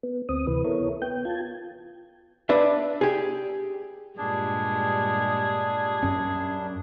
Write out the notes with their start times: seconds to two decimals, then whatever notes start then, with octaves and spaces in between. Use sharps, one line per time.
0.03 B3
0.29 D2 C4 D#6
0.47 D2 C3 E3 B4
0.64 B3 E4 A4 A#4 C#5
1.02 B3 G5 G6
1.25 F4 A5 G#6
2.49 D4 B4 E5
3.01 G4 G#4
4.18 G2 A#2 G3 G#3 D4 G#4
6.03 F#2 C#4